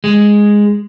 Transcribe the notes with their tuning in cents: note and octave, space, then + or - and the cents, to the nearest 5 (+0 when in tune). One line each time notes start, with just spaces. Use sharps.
G#3 -5